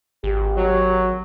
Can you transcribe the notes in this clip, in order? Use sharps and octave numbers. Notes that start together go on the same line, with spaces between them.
G#1 G4
F#3